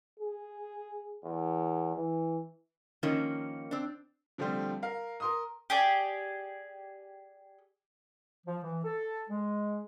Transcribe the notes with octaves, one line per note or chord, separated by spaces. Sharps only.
G#4
E2
E3
D#3 F3 A#3 C#4
C4 D4
D3 F3 G3 A3 C4 C5
A#4 F5
A#4 C6 D#6
G4 G#4 D5
F3
E3
A4
G#3